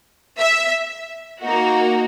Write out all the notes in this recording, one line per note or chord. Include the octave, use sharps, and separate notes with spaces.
E5
A#3 D#4 F#4